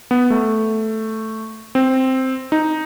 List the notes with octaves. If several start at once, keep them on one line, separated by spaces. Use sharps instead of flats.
B3
A3
C4
D#4